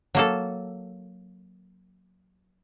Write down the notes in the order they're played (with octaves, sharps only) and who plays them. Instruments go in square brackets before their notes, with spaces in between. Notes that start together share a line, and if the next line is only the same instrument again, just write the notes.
[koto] F#3 A#3 A4